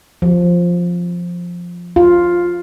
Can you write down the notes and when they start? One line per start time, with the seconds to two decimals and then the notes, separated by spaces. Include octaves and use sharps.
0.22 F3
1.96 F4